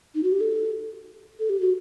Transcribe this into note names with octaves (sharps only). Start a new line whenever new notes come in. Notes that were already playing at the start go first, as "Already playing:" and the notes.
D#4
F#4
G4
A4
A4
G4
F#4